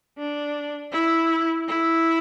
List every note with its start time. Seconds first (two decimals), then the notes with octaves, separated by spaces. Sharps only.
0.18 D4
0.92 E4
1.68 E4